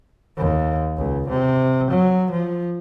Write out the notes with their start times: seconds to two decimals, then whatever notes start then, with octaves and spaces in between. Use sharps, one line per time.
0.38 D#2
0.97 C#2
1.29 C3
1.91 F#3
2.31 F3